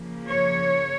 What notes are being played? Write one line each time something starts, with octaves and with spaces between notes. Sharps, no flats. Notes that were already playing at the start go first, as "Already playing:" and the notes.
Already playing: C#3 F3 A#3
C#5